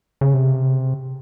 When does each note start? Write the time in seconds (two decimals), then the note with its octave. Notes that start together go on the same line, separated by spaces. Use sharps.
0.21 C#3
0.34 C3